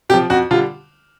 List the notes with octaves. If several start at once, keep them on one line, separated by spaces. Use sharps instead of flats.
C3 F3 G4
F2 F#4
D3 G3 F4